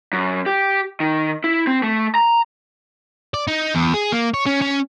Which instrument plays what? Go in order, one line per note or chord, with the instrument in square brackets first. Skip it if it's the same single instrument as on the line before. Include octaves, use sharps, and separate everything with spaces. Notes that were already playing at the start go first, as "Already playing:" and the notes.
[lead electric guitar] F#2
G4
D#3
E4
C4
A3
A#5
[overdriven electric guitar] D5
D#4
E2
G#4
A#3
C#5
C#4
C#4